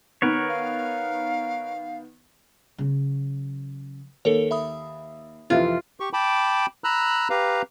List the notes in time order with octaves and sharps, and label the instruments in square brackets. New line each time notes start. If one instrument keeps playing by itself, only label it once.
[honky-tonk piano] D#3 B3 [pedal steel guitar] A#4 B4 C#5
[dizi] F5
[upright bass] C#3 F#3
[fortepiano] D#2 [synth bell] A4 A#4 C#5
[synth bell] E5 B5 D#6
[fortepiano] F2 C3 E3 [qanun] F4
[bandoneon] G4 C#6
G5 A5 B5 D6
A#5 B5 E6 F#6
G4 B4 F5 A#5